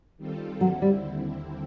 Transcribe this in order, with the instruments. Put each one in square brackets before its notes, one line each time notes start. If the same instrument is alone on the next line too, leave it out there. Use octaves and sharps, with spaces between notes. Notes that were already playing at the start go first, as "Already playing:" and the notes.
[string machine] D#3 G3 C4 F4 A4
[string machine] D#2 D3 G3 C4 E4 [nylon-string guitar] F#3
[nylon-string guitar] G3